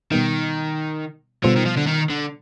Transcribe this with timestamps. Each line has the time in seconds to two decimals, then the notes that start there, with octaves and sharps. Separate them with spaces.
0.12 B2 D#3 G3 B3 D#4
1.44 B2 D3 G3 B3 F4 C5
1.56 D#3
1.66 F3
1.77 D3
1.87 D#3
2.09 D3